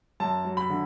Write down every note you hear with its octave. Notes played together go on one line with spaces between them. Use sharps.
F#2 A5
F#3
B5
D3